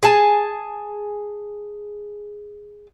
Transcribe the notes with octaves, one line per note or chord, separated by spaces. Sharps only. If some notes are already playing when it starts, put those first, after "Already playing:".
G#4 G#5 A5